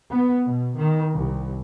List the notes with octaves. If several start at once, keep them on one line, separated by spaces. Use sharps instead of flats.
B3
B2
D#3
C2